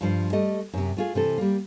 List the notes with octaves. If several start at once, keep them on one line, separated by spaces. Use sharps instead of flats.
G2 F3 C5
G3 A3 D#5
F#2 C3
A3 F4 G#4
C3 E3 A4
G3 A#3